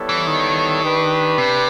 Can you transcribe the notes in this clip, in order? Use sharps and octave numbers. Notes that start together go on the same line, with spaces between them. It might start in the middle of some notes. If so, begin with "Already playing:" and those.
Already playing: G3 B3 E4 A4 C#5
E3
D#3
D4 G4 B4
C3